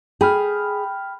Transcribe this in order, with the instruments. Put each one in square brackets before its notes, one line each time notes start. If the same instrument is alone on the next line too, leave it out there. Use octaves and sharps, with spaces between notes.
[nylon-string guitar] G#4 [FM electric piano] G5 B5 F6